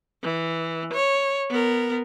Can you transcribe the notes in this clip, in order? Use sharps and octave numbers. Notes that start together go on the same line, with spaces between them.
E3
C#5
B3 A#4